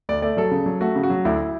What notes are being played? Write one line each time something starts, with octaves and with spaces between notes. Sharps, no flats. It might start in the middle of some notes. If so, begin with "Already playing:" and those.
D2 D5
A3 D5
F#3 A4
C#3
F#3
A3 F#4
C#3
F#4
F#3
D2 E4